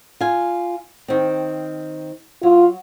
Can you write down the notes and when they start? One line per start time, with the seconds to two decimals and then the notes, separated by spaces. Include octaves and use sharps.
0.20 F4 G#5
1.08 D#3 C4
2.43 F#3 F4